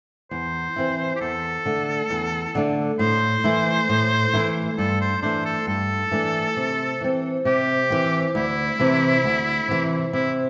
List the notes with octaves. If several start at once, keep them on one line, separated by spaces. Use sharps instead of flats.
E2 C5
E3 C4 E4
G4
E2 A4
D3 A3 D4
E2
D3 A3 D4
A2 C5
E3 A3 E4
A2
E3 A3 E4
G2 A4
C5
E3 A3 D4 C5
A4
G2 A4
E3 A3 D4
C3
E3 C4
C3 G4
E3 C4
D2 E4
C3 E3
D2
C3 E3
C3 E4